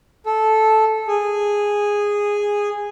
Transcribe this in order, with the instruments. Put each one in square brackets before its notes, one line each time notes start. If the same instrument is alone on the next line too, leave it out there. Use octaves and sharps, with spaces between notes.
[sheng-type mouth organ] A4
G#4